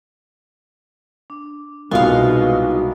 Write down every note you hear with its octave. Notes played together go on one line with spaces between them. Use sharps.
D4
C2 B2 G#3 D#4 F4 F#4 F5